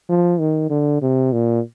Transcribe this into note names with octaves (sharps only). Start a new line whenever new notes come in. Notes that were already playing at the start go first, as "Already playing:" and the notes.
F3
D#3
D3
C3
A#2